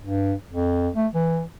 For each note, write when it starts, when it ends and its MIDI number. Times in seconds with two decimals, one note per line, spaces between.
0.03 0.34 43
0.51 0.89 41
0.96 1.07 57
1.14 1.43 52